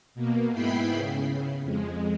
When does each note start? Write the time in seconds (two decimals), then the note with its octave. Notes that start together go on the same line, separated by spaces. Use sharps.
0.15 B2 A#3
0.52 G#2 B3 E4 G5 B5 C7
0.91 C#3
1.63 F2 G#3